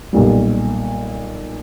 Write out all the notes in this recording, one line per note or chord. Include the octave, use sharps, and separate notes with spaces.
B1 A#2 G3